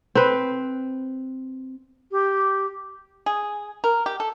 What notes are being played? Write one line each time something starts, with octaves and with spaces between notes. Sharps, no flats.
C4 B4
G4
G#4
A#4
G4
A4